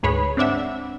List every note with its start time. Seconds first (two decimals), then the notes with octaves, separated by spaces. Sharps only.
0.03 D2 G#2 G#4 B4 C#5 B5
0.37 C4 D4 D5 E5 F#5